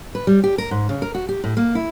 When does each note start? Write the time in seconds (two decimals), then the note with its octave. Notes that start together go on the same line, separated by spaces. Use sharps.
0.15 B4
0.27 G3
0.44 G4
0.58 A#4
0.71 G#2
0.89 C#3
1.02 A#4
1.15 F#4
1.29 G4
1.44 A2
1.57 A#3
1.75 E4